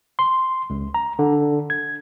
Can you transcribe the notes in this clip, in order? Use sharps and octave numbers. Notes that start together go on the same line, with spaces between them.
C6
C#2
A#5
D3
G#6